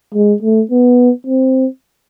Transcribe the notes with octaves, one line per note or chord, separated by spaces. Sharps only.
G#3
A3
B3
C4